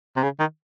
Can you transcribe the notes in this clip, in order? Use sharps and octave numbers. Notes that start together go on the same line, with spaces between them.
C3
C#3
D#3